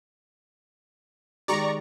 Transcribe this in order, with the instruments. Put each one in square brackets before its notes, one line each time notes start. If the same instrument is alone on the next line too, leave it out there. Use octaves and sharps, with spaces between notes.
[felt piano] D#3 G#3 G4 [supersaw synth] D5 A#5 C#6